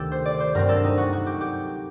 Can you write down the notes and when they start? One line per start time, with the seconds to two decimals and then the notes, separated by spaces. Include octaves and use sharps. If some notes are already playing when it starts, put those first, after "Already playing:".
Already playing: D2 C3 D#3 G4 A4
0.12 C5
0.26 D5
0.40 C5
0.55 G2 F#3 C4 A#4
0.69 A4
0.84 D#4
0.98 F#4
1.13 F#4
1.26 G4
1.41 G4